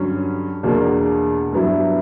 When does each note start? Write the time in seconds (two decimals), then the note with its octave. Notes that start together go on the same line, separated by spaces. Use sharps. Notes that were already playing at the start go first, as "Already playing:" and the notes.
Already playing: G2 D3 F#3 C#4
0.63 E2 B2 A#3 D4
1.53 G2 F#3 B3 E4